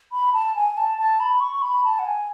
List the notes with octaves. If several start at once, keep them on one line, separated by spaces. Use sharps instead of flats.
B5
A5
G#5
A5
A5
B5
C#6
B5
A5
F#5
G#5